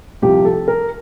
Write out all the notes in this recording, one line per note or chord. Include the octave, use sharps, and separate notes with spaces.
C2 C3 F3 G4
A4
A#4